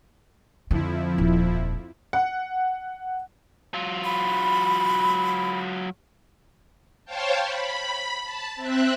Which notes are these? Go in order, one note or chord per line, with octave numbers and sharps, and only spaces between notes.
F2 D3 F3 E4
D#1
F#5
F#3 F4
B5
C5 C#5 F5 G5 A5
B5
A5
C4 E5 F#6